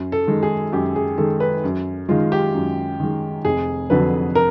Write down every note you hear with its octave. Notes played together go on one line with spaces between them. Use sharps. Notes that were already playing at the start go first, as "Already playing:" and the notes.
Already playing: F#2
A4
D#3 G#3
G#4
F#2 G4
G#4
D#3 G#3 A4
B4
F#2
D#3 G#3 F4
G4
F#2
D#3 G#3
F1 G#4
F2 D3 F#3 B4
A#4